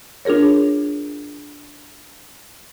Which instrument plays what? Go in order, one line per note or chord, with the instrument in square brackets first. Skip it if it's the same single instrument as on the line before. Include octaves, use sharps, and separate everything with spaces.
[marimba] D4 F4 G#4 A#4 C#5